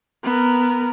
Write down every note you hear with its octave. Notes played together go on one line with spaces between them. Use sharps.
B3 A#4